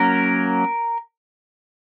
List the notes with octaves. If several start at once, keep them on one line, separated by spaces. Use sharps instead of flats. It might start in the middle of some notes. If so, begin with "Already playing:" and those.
Already playing: F#3 A#3 C#4 A#4